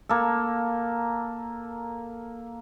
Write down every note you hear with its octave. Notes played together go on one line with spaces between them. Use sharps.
A#3 A4